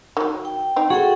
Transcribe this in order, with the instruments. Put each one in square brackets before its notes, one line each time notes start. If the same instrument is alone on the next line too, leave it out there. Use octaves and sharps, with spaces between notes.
[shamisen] D#3 F#3
[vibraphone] G5
[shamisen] C4 D#4
[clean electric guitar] F#4 [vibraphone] G#4 A4 G5